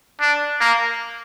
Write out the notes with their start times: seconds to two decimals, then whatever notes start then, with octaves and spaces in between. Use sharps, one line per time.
0.21 D4
0.61 A#3